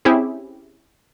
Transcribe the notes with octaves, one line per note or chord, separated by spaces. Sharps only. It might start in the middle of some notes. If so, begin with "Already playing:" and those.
C4 C#4 E4 G4 G#4